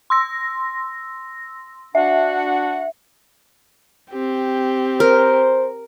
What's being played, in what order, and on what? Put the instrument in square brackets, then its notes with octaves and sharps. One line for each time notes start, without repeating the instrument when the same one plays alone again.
[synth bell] C6 E6 A#6
[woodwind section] D4 F#4 F#5 [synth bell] E5
[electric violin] C4 G4
[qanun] A#4 [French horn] C5